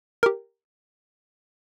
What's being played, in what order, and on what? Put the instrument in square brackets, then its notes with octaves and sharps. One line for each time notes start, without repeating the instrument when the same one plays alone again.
[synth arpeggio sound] G4 A#4